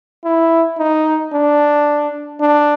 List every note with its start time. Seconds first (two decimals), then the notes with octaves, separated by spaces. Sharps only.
0.25 E4
0.78 D#4
1.33 D4
2.41 D4